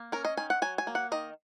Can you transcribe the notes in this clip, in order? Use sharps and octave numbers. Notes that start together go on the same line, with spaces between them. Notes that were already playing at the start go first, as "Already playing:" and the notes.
Already playing: A#3
C#4 A#4
D#5
D#3 G#5
F#5
F#3 G#5
G#5
A#3
F#5
D#3 D#5